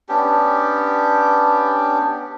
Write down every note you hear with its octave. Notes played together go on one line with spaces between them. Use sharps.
B3 C#4 D4 G4